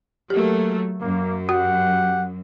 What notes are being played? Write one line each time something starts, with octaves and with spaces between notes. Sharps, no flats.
F#3 A3 A#3 G4
F#2 A#3
F#4 G4 F#5